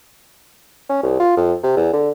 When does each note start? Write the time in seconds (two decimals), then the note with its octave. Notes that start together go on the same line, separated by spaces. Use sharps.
0.90 C#4
1.03 C2
1.20 F4
1.37 F2
1.64 C3
1.77 E2
1.93 D3